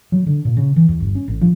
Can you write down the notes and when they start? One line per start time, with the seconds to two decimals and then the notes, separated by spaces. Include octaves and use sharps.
0.12 F#3
0.26 D3
0.45 A#2
0.57 C#3
0.76 E3
0.89 E2
1.00 G1
1.15 C#4
1.28 A1
1.41 F3